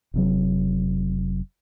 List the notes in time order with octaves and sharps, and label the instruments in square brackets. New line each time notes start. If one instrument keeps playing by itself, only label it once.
[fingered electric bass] F1 C3 F#3